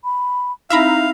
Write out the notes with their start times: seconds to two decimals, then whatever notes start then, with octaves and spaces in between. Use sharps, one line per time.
0.04 B5
0.70 C4 D#4 E4 E5 F5 A#5 B5